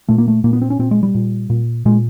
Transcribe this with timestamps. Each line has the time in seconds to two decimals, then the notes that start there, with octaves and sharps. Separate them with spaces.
0.09 A#2 A3
0.18 A#3
0.28 A3
0.44 A#2 A#3
0.53 B3
0.62 C4
0.70 C#4
0.79 A#2 C4
0.91 G#3
1.03 G3
1.15 A#2
1.50 A#2
1.85 A#2 G#3